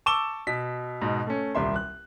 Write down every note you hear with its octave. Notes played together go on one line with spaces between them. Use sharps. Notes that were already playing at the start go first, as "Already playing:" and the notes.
A5 C#6 D6 E6 E7 G7
B2 B6
G#2 B2
A3 C#4
D#1 C2 E5 C6
F#6